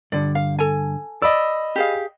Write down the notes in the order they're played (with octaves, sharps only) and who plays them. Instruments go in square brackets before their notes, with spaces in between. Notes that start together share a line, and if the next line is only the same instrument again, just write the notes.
[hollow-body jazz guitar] G2 D3 [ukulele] D5
[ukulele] F5
A4 G#5
[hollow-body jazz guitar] D5 [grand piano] D#5 B5 E6
[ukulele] G4 G#4 F5